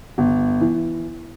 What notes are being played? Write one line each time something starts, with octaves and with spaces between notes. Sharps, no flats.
G1
E3